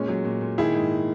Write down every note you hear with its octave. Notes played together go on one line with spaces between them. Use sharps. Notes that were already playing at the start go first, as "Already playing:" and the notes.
Already playing: A#2 G#3 C#4
F#3
A#2
A#2
D#3 E4 G#4
G#2